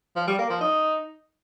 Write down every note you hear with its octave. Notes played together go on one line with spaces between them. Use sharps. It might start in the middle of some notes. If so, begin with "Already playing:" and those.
F3
G3
A#3
F3
D#4